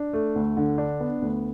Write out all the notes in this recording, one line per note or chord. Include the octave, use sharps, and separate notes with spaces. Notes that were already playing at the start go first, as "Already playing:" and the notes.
Already playing: D4
A3
D2
D3
D4
B3
D2